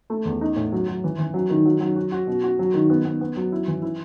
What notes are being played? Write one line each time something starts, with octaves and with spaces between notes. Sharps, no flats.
A3
E2
D#4
A2
F#3
F#3
E3
E3
F#3
D#3
F#3
F#3
F#4
F#4
B2
F#4
F#3
D#3
B3
B3
B3
F#3
E4
E3
E4